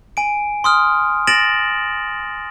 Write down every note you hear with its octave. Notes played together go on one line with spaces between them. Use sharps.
G#5 D7
C6 D#6 F6
A6 A#6 D7 E7 F#7